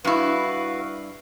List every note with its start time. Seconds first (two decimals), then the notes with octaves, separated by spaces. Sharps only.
0.05 G2 E4 F#4 B4 F5